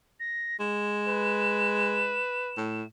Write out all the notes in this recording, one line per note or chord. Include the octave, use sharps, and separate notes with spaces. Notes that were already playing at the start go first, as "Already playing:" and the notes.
A#6
G#3 E7
B4
A2